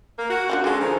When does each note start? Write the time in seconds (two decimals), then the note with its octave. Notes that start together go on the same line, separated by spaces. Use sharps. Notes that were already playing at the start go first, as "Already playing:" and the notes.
0.18 A#3
0.30 F#4
0.50 D4 F4 G4
0.64 G#3 C#4 D4 A4
0.80 D#3 F3